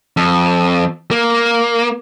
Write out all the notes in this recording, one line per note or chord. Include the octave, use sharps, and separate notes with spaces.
F2
A#3